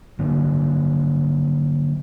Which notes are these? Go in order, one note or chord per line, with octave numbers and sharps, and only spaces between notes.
D3 F#3 A#3